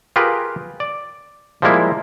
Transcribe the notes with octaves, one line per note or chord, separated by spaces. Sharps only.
F4 G4 G#4 A#4 B4
D5
F3 G3 G#3 A#3 E4